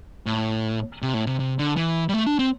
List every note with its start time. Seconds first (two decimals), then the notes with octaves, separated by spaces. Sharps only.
0.26 A2
1.02 C3
1.14 A2
1.27 C3
1.39 C3
1.59 D3
1.77 E3
2.09 G3
2.14 A3
2.26 D4
2.39 C4